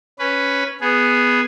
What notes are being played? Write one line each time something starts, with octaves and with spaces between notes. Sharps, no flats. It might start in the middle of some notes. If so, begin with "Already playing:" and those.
C#4 B4
B3 G#4